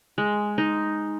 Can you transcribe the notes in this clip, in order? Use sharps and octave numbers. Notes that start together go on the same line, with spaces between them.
G#3
D#4